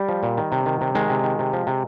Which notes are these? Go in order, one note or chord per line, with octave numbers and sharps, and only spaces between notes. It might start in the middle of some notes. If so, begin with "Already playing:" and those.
Already playing: G3
F3
A#2
D#3
C3
D#3
C3
D#3 G#3
C3
D#3
C3
F3
C3